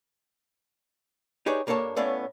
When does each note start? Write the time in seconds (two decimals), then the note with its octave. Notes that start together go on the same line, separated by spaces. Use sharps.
1.46 D#4 G4 G#4 B4 C#5 D5
1.67 G2 A#3 D4 A4 C#5 A5
1.96 A2 A3 B3 C#4 D5 F5